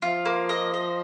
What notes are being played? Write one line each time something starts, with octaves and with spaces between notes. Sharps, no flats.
F3 F4
A#3
D#5
D#5